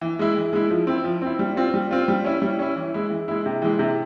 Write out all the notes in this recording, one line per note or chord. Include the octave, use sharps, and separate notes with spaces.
E3
G#3 E4
E3
G#3 E4
F3
C4 E4
F3
C4 E4
G3
C4 F4
G3
C4 F4
G3
C#4 E4
G3
C#4 E4
E3
G#3 E4
E3
G#3 E4
C3
E3 G#3
C3